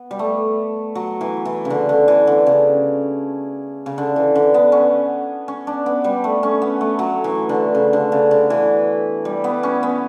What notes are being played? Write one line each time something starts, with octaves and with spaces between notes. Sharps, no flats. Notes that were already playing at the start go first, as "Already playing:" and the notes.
Already playing: B3
G3
A3
F#3
E3
E3
C#3
D3
D3
E3
D3
C#3
C#3
D3
E3
D3
B3
C#4
C#4
D4
B3
G3
A3
C#4
B3
A3
F#3
E3
D3
C#3
D3
C#3
D3
E3
G3
B3
C#4
B3